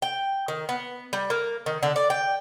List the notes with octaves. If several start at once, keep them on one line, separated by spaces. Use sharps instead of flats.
G5
D#3
B3
G3
A#3
D#3
D3
D5
G5